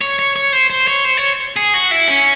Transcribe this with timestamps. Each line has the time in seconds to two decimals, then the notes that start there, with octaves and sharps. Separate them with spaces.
0.01 C#5
0.19 C#5
0.36 C#5
0.53 C5
0.70 C5
0.87 C#5
1.05 C5
1.17 C#5
1.56 G#4
1.74 F#4
1.91 E4
2.08 C#4